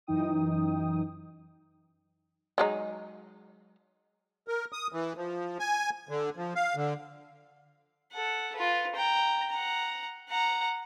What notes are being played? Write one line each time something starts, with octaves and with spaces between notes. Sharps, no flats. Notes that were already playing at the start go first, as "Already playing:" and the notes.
F#2 E3 D#4 G5 D#6
F#3 G#3 D#4
A#4
D#6
E3
F3
G#5
D3
F3
F5
D3
A4 F#5
F4 B4
G5 A#5
F#5 A#5
F#5 A#5